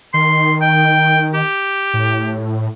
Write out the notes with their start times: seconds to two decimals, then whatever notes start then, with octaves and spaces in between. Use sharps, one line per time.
0.14 D#3 C6
0.61 G5
1.34 G4
1.94 A2